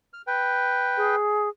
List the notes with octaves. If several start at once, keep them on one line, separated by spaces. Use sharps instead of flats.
F6
B4 G5
G#4